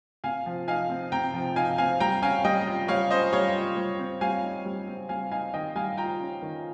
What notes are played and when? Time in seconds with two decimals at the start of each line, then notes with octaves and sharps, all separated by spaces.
0.24 C3 F5 G#5
0.46 F3
0.68 D#4 F5 G#5
0.90 C4
1.12 C3 G5 A#5
1.34 F3
1.56 D#4 F5 G#5
1.78 C4 F5 G#5
2.00 G3 G5 A#5
2.22 C#4 F5 G#5
2.44 G3 D#5 G5
2.67 F4
2.88 G3 C#5 F5
3.10 C#4 C5 D#5
3.32 G3 C#5 F5
3.55 F4
3.77 G3
3.99 C4
4.21 G3 F5 G#5
4.43 D#4
4.65 G3
4.88 C4
5.09 G3 F5 G#5
5.31 D#4 F5 G#5
5.54 D#3 D#5 G5
5.75 G3 F5 G#5
5.97 F4 G5 A#5
6.20 C#4
6.42 D#3